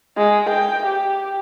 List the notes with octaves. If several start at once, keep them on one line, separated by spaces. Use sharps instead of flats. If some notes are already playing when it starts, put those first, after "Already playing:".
G#3
G5
G4